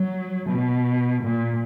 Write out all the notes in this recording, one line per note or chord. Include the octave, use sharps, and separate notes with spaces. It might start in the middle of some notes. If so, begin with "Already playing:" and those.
Already playing: F#3
B2
A#2